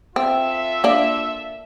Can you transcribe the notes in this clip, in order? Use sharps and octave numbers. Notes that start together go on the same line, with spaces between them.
C4 F4 A4 E5
A#3 D4